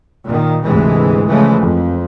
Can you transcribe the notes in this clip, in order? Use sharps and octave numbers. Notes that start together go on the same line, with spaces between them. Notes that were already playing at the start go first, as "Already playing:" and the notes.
A#2 D#3
D2 G#2 C3 E3 G#3
C#3 E3 F3 G#3 A3
F2